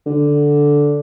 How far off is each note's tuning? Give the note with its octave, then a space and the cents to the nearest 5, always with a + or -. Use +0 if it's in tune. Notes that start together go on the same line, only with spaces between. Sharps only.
D3 -5